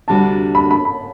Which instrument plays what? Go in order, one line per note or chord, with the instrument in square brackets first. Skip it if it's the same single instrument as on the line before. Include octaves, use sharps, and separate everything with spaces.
[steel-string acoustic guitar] D2 C3 G3 D4 F#4 [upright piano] A5
[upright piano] B5
B5
B5